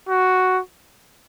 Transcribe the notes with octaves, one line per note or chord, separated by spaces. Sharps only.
F#4